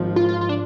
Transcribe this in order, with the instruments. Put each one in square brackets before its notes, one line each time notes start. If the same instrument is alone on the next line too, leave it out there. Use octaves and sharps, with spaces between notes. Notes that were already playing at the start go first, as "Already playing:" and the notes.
Already playing: [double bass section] G#1 G#2 F3
[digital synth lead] F4
F4
F4
D4